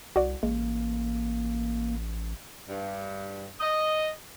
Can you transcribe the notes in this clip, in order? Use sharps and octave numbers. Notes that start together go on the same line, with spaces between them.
C2 F#4 D5
A1 G#3 A#3
G2
D#5